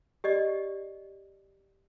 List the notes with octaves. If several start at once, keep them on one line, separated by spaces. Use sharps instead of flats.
G4 D5 D#5